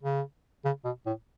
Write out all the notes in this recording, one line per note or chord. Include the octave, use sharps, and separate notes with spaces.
C#3
C#3
B2
A2